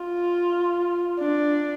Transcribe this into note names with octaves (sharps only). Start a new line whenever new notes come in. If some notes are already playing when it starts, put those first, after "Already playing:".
Already playing: F4
D4